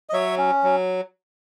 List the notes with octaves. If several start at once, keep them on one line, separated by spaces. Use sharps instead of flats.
D#5
F#3 C#5 E5
C#4
F#3